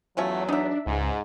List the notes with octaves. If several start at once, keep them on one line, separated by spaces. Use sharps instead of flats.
E2 F#3 A3 C#4 F4
D4 D#4 E5
C#2 G#2